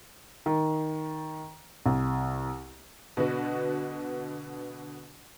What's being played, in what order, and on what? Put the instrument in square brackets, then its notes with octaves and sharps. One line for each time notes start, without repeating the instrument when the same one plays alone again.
[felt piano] D#3
C2
[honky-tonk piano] B2 D3 B3 F#4